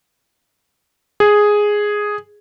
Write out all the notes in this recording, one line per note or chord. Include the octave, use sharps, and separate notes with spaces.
G#4